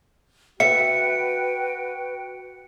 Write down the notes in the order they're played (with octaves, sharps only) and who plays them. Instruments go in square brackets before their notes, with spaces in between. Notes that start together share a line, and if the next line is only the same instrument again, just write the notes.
[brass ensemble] F#4 [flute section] B4 G5 [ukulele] E5 [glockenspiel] C#7